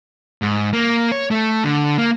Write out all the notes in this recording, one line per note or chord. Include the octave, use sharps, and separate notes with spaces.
G#2
A#3
C#5
A3
D3
A#3